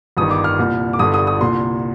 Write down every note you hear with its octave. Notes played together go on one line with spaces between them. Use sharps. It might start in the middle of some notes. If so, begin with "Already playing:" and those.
G1 G2 D#3 D#6
D6
F6
C2 A#2
D6
G1 G2 D3 D#6
D#6
D#6
C2 A#2 C6